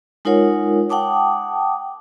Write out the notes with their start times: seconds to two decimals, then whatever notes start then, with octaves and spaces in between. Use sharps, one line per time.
0.25 G#3 D#4 F4 A#4 C#5 F#5
0.90 F#5 G5 A5 D6 D#6